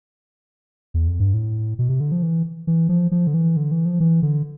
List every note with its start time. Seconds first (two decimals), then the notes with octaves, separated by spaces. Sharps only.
0.94 E2
1.07 F2
1.20 G2
1.34 A2
1.79 B2
1.89 C3
2.00 D3
2.12 F3
2.22 E3
2.67 E3
2.89 F3
3.12 F3
3.27 D3
3.34 E3
3.57 D3
3.72 E3
3.85 F3
4.00 E3
4.22 D3